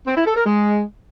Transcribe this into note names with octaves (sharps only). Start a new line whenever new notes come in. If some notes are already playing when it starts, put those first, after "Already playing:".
C4
E4
A4
A#4
G#3